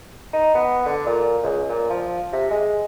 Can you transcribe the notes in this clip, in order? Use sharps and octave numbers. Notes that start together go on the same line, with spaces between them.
D#4
B3
D3
A#2
C#2
A#2
F3
C3
G#3